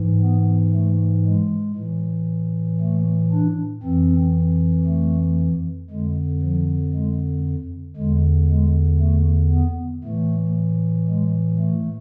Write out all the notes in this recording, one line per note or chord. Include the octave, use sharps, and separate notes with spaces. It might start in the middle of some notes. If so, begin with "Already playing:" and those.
Already playing: G#2 E3
B3
A3
G#3
A2 E3
A3
D4
F2 E3 C4
A3
F2 D3 G#3
F3
G#3
E2 D3 G#3
G#3
A3
B3
A2 E3 A3
G#3
A3